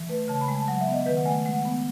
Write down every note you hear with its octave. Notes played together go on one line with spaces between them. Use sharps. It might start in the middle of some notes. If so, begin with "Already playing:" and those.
Already playing: E3
A3 B4
C#3 A5
B5
G#3
A5
F#3 F#5
E5
B3
D#5
D#3 B4
F#5
A3 G#5
G#3 F#5
B3